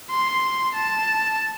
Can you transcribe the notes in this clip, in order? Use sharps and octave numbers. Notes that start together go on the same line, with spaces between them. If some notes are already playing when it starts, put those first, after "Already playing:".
C6
A5